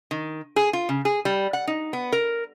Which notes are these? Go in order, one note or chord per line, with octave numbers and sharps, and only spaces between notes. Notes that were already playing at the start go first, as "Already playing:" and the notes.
D#3
G#4
F4
C#3
G#4
G3
F#5
D#4
B3
A#4